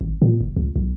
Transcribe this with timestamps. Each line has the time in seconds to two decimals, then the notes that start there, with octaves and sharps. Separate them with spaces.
0.01 G#1
0.22 A#2
0.41 F#1
0.56 C#2
0.76 B1